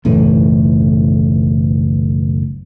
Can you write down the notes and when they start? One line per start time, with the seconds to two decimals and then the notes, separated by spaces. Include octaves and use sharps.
0.05 F#1 B1 A2 E3